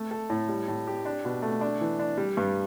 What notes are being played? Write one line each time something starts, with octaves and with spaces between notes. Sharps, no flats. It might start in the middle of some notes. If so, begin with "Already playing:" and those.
Already playing: A3
A4
A2
G3
A2
G4
D4
B2
A3
D4
E3
D4
G3
G2